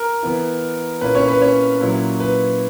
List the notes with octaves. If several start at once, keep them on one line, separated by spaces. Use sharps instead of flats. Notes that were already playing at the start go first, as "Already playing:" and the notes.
Already playing: A#4
E3 B3 E4
A#2 A#3 C#4 E4 B4
C#4 C#5
B4
C#4 C#5
A#2 F#3 C#4 E4
B4